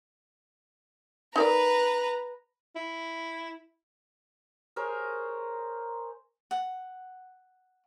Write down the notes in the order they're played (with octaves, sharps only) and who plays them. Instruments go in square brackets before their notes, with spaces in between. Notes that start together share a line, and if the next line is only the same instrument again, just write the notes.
[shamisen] D#4 A#4 D5 [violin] B4 A#5
[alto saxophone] E4
[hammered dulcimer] G#4 A#4 C5 C#5
[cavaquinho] F#5